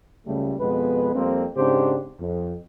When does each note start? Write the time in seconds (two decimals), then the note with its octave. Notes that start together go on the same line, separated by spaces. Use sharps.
0.27 C#2 C#3 G3 A3
0.59 F2 B2 G#3 B3 B4
1.15 F2 G3 A#3 C4
1.56 G#2 C#3 C4 D4 G4 C5
2.20 F2